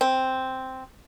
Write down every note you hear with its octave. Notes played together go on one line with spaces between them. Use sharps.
C4